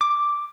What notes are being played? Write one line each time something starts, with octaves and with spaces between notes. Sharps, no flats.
D6